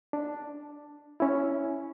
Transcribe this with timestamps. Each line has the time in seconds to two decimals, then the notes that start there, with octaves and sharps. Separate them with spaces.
0.13 D4
1.20 C#4 E4